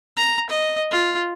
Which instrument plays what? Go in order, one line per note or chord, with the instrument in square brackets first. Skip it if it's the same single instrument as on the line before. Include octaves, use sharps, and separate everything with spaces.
[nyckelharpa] A#5
D#5
F4